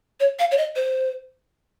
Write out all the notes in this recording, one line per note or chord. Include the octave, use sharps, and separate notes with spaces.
C#5
F5
C#5
D#5
C5